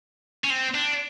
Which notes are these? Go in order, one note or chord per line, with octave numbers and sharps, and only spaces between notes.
C#4
C4
D4